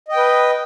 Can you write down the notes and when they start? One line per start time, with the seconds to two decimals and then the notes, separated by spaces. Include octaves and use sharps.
0.08 D#5
0.12 G5
0.17 B4